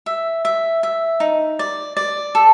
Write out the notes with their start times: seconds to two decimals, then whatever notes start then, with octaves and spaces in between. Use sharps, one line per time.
0.06 E5
0.45 E5
0.83 E5
1.20 D#4
1.59 D5
1.97 D5
2.35 A4